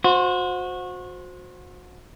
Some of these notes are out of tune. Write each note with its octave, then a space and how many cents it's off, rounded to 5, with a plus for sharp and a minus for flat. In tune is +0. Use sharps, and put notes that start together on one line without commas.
F#4 -30 C5 +0